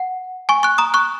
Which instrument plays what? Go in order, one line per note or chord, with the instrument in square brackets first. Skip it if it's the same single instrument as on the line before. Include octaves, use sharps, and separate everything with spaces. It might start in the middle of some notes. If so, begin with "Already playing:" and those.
Already playing: [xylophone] F#5
G#5 C#6
C#6 F#6
A#5 D#6
C#6 F#6